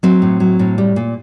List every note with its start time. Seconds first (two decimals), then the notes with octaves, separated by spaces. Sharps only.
0.03 F#3 C4
0.22 A2
0.40 F#3
0.59 A2
0.78 G3
0.96 A#2